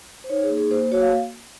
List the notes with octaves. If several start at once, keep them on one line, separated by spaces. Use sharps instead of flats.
C5
D#4 C#5
G#4
A#3
G#4
A#3 C5
F#4 C#5
F5